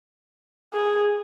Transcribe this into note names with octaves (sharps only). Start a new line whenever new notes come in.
G#4